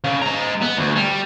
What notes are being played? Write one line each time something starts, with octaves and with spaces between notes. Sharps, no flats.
C#3
G#3 A#5
B3
D2
G3